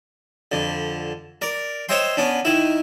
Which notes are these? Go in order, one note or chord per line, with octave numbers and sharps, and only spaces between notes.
F2 D3
A#4 D5
C5 C#5 D#5 E5 G5 C6
B3 C#4 D4
D#3 E4 E5